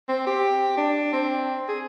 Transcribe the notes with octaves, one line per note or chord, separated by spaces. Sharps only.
C4
G4
D4
C4
G#4